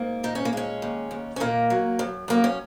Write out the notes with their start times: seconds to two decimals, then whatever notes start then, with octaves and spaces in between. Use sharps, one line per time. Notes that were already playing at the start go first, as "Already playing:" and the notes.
Already playing: G#2 A#3
0.23 A#2 D#4
0.35 C#4
0.45 A#3
0.53 G#3 C#4
0.82 D#2
1.11 D#2
1.36 C#4
1.40 A#2 A#3
1.70 F#3
1.99 F#2
2.28 F#2 A#3
2.44 C#4